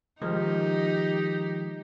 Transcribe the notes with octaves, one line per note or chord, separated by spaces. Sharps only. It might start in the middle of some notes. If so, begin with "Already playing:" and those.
D#3 F3 G#3 D#4 G4